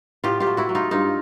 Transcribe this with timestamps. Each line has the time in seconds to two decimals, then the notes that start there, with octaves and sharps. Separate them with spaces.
0.24 A2 F4 G4
0.40 F4 G4
0.47 F#3
0.57 E4 F#4
0.69 F#3
0.75 D#4 F4
0.91 G2 D#4 F4